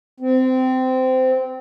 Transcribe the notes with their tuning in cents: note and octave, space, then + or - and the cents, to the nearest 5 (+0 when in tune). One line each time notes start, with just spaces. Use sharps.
C4 -20